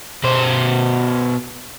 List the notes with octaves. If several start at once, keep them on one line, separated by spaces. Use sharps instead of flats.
B2 C5